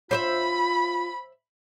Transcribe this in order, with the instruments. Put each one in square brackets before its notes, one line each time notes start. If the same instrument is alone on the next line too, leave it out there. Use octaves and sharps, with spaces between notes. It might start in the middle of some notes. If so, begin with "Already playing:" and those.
[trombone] F4 [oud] C5 D5 E5 [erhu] B5